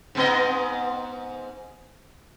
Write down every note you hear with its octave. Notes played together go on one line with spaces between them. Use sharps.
G#2 B3 D#5